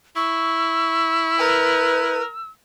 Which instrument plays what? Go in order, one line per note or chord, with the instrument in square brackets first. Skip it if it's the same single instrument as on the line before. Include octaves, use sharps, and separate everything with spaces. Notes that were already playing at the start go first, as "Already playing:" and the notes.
[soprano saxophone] E4 [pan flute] C#6 [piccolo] E6
[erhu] A#4 [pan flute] B4